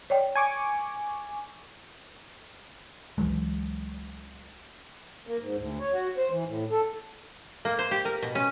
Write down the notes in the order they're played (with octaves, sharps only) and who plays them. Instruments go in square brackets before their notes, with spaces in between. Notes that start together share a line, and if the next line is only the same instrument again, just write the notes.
[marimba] C#5 D5 G5
[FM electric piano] G#5 C#6 D6
[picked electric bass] C#2 E3 F#3 G#3
[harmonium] A#3
G#2
D2
C#5
F#4
C5
E3
A2
A4
[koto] A#3
C5
G4
A#4
B2
C#4